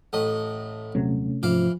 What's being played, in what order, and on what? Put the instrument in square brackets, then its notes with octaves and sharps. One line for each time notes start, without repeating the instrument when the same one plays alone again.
[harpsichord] A1 A2 D#5
[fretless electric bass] D#1 F#3 [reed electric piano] C3 A3 C#4
[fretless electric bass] G#2 [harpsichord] E3 F5 D6 [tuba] F3